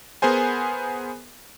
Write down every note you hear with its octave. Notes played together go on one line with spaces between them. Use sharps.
B3 G#4 A#4 C5 G#5